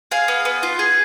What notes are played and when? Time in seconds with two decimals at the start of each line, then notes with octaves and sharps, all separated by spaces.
0.11 G#4 F5
0.28 B3
0.45 B3
0.63 F4
0.79 G#4